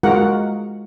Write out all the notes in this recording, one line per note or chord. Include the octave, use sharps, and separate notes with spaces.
G#3 F4 F#4 A#4 F#5